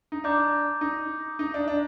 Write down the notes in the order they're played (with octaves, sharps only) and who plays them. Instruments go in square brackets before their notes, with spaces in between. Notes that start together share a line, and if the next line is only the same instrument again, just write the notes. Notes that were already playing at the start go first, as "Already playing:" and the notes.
[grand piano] D#4
[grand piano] D4 [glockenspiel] A#5 D6 G6
[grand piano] D#4
D#4
D4
D4